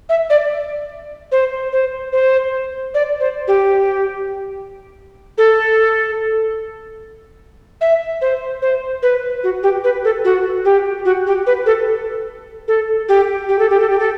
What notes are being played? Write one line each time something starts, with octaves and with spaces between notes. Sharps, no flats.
E5
D5
C5
C5
C5
D5
C5
G4
A4
E5
C5
C5
B4
F#4
G4
B4
A4
F#4
G4
F#4
G4
B4
A4
A4
G4
G4
A4
G4
A4
G4
A4